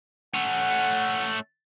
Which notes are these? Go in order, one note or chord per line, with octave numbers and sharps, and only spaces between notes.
A3 C#4 F#5